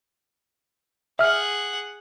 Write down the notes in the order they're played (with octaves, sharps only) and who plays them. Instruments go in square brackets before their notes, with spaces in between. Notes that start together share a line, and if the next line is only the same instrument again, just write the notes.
[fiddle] G#4 F#5 [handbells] E5 F6